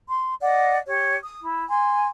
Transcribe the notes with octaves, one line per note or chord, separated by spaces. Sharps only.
C6
D5 D#5 F#5
G4 C#5
D#6
E4
G#5 C6